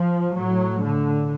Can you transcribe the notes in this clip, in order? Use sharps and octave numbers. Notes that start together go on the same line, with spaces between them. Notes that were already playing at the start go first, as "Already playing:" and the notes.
Already playing: F3
A2 F#3
D3